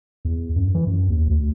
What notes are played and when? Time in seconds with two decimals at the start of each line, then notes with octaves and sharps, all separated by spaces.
0.25 E2
0.56 F#2
0.74 E3
0.87 F#2
1.09 D#2
1.28 D2